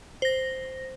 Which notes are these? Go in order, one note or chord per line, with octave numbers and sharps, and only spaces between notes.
C5 A#6